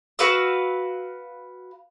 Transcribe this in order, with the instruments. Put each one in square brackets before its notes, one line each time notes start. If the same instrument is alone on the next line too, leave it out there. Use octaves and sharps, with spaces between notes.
[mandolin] F#4 B4 F5 E6